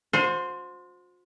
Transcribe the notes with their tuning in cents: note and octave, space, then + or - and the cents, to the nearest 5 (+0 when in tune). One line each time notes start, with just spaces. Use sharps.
F#4 -45 C5 +0